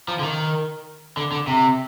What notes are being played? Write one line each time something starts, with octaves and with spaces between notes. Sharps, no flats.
F3
D3
D#3
D3
D3
C3